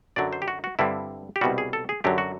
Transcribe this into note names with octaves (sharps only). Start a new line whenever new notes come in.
F#2 D3 F#3 D5
C5
G4
F#4
F#4
G2 D3 G3 C4 E4
G4
C2 B2 G3 F#4
G#4
A4
G#4
F#2 D3 F#3 G4
F#4